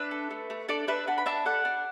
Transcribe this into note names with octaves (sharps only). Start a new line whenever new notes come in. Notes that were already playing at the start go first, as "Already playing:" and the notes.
Already playing: D4 B4 E5
A4
A3
A3
D4 A4 D5
D4 B4 E5
D4 F#5 B5
B5
D4 E5 A5
A4 D5 F#5
D4